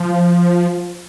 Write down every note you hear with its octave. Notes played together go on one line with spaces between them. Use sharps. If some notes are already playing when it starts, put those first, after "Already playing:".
Already playing: F3